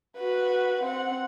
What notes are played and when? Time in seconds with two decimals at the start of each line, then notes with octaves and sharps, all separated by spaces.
0.17 F#4 B4
0.84 C4 F#5